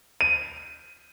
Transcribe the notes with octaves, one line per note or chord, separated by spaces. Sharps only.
D#7